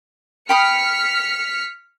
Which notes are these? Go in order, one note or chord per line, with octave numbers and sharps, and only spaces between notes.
G5 B5 D#6 F6 B6 C#7